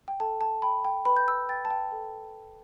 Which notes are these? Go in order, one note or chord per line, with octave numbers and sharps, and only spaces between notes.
G5
A4 A5
A5
G5 B5
G5
B4 B5
G6
E6
G5 A6
A5
G5
A4